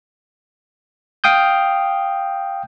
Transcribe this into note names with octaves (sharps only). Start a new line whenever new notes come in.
F5 G5 D#6 G6